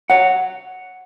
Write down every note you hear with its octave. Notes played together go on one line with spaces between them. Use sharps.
C#5 F#5